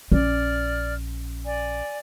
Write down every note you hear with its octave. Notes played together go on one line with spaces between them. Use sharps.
A#1 C#4 D5 F6
D5 G#5